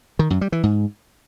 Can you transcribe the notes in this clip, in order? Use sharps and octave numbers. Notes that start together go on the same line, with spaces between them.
D#3
F#2
G3
E3
G#2